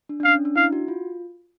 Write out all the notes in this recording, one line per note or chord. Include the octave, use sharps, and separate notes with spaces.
D4
D4
C#4 F5
C#4
D4
E4 F5
F#4
F4